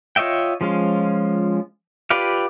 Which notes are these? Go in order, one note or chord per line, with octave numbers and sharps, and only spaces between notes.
F4 C#5 D#5 E5 G5
F3 G#3 C#4 F4
F4 G4 B4 D5 F5